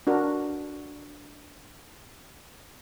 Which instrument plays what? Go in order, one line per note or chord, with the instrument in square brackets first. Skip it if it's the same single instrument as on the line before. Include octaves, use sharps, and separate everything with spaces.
[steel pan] D4 F#4 A#4